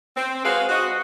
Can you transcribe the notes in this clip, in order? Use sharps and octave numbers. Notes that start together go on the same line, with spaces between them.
C4
G#3 F#4 G#4 B4 C5 F5
F#4 D#5